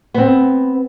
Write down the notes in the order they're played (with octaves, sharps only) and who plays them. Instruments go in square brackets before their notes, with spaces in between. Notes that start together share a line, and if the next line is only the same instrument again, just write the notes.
[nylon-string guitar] B3 C4